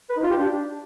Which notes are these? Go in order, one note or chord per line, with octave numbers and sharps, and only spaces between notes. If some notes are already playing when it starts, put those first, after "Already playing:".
B4
D#4
F4
G4
D4